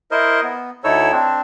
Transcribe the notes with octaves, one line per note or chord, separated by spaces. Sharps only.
E4 A#4 C5 D#5
B3
D2 D#4 E4 A4 C#5 E6
C4 D4